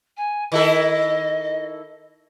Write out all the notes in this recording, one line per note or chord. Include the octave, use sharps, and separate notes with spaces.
G#5
D#3 E4 A4 D#5